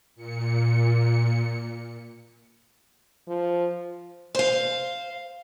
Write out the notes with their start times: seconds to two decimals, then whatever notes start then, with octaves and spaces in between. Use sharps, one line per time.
0.16 A#2 C#7
3.28 F3
4.35 C5 F5